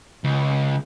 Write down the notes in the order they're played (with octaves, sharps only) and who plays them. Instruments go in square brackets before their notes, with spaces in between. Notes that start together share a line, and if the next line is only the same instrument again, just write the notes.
[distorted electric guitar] C#2